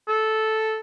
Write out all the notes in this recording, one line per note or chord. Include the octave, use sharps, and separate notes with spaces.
A4